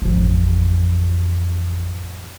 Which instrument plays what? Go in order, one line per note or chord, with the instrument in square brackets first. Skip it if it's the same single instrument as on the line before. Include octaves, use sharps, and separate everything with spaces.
[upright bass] A1 F2